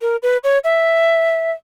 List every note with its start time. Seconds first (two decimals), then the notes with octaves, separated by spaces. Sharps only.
0.02 A#4
0.23 B4
0.44 C#5
0.64 E5